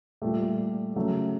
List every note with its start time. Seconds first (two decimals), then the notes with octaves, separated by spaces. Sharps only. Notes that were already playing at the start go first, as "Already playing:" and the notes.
0.22 A#2 G3 A3
0.96 C#3 F#3 A3